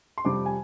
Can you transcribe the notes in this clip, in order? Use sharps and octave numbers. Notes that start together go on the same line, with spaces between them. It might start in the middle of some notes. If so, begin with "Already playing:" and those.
C6
F2 C3 G3 D6
G#5